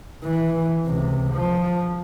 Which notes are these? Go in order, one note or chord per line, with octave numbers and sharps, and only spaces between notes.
E3
C#2 C3
F3